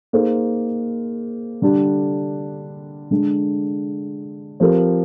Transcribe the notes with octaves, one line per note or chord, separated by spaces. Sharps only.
A#3 D#4 G#4 C5
D3 G3 D4
D3 G#3 D4
F3 C4 G4 A#4